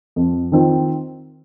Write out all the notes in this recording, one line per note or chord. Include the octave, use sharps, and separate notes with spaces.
F2
D#3 C4 F4